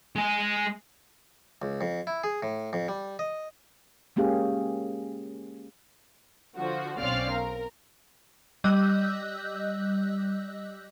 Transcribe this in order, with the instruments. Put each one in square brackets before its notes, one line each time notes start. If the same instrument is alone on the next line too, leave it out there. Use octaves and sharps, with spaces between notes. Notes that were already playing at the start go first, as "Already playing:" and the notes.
[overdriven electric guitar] G#3 G#5
[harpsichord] C#2
F2
E4
G#4
A2
F2
G3
D#5
[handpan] G#3 A#3 C#4 G4 G#4 F5
[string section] D3 F3 F#4
B1 C4 C#4 D5 F5 F6
A#4
[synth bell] G3 D#5 E6 F#6 G6